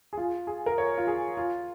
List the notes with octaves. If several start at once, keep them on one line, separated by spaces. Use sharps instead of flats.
G#4
F4
G#4
A#4
C#5
F4
G#4
F4